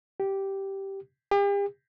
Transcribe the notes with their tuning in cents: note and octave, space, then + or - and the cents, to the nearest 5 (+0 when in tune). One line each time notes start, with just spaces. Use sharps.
G4 -10
G4 +40